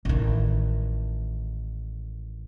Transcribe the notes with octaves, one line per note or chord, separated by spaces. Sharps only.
A1 D#3